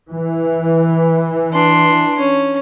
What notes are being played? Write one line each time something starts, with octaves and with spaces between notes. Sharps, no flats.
E3
D4 C6
C#4